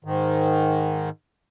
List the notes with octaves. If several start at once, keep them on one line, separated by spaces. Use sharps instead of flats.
G#2 D#3